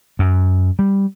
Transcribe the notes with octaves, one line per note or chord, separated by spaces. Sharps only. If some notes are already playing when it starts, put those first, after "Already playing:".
F#2
G3